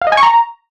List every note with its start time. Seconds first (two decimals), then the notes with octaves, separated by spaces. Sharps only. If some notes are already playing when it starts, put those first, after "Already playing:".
0.02 F5
0.07 D#5
0.12 G#5
0.17 C#6
0.23 A#5